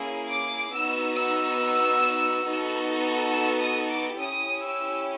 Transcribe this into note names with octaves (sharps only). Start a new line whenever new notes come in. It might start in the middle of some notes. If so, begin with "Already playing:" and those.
Already playing: A#3 C#4 E4 G#4
D6
B3 D#4 F#4 E6
E6
B3 D#4 F#4 A4
E6
D#6
D6
C#4 E4 G4 D#6
E6